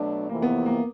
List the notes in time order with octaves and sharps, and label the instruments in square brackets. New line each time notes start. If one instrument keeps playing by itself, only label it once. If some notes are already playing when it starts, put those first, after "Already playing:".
Already playing: [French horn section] B2 F#3 A3 D4
[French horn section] F2 C3 E3 [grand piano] A#3
[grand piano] B3
A#3